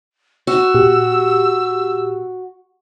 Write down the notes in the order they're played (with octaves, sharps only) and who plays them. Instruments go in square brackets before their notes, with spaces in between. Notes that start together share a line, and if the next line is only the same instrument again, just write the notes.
[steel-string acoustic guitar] F#4 [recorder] E6
[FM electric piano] A#2 G4